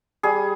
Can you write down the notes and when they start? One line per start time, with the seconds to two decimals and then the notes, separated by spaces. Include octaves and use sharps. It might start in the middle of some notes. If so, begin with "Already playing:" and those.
0.23 G3 G#4